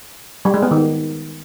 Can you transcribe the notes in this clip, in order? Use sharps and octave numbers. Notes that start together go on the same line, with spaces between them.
G3
G#3
B3
D#3